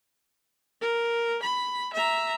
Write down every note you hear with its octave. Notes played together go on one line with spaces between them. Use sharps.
A#4
B5
E5 A#5